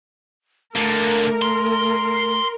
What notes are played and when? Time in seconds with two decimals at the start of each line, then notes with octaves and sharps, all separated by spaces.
0.76 D3 A3 A#3 A#4
1.42 C6